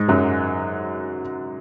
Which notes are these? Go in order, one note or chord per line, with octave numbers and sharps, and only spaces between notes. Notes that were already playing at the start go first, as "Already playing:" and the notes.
Already playing: G#2 G#3
F#2 F#3